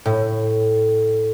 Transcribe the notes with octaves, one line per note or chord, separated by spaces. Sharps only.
A2